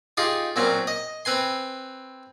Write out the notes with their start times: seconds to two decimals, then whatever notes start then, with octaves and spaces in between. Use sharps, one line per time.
0.17 D#4 F4 G4 G#4
0.56 A#2 F#3 C4 C#4
0.87 D#5
1.25 C4 B4 G#5 C6